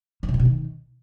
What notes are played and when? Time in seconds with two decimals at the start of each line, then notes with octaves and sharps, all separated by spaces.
0.23 D#3
0.28 C3
0.34 A2
0.39 B2
0.45 D#3